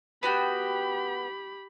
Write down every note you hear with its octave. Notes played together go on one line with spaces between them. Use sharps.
B3 F#4 G4 G5 B5